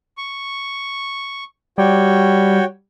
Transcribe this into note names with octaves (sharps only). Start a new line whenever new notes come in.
C#6
G3 F#4 C#5 G5